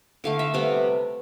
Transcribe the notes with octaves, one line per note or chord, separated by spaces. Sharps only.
D3 A3 F5
E5
C3 G3 B3 F5